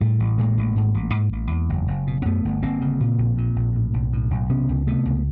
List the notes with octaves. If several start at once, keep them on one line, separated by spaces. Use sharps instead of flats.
A2 G3 A3
A1
A2 G#3 A#3
A1
G#2
A1
G#2
A1
E2
F#1
F#1
B2
C4
F#2 A3 B3
G1
G1 A#3 C4
C#3
A#2
A#1
A#2
A#1
A2
B1
A2
B1
C3 B3 C#4
C#2
C3 A3 B3
C#2